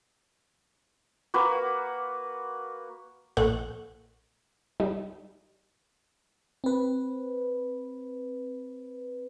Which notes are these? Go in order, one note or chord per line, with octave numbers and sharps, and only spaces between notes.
A#3 F#4 B4
A#1 A#2 A4 F#5 C#6 F#6
G3 D#4
C4 B4